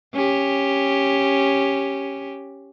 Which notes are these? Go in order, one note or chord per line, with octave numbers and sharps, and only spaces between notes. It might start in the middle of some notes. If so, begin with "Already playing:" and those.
C#4 G4